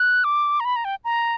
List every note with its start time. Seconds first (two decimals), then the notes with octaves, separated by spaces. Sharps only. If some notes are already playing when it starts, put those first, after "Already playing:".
Already playing: F#6
0.24 D6
0.60 A#5
0.65 B5
0.76 A#5
0.85 G5
1.05 A#5